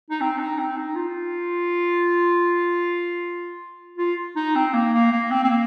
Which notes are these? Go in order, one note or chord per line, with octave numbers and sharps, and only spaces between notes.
D#4
C4
D#4
C4
D#4
F4
F4
D#4
C4
A#3
A#3
A#3
C4
C4
A#3